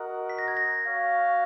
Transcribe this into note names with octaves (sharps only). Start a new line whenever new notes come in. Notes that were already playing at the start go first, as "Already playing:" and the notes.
Already playing: F#4 A#4 D#5 F#5
B6
A#6
G#6
A#6
F#4 C#5 F5